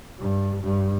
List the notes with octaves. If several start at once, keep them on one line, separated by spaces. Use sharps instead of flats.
G2
G2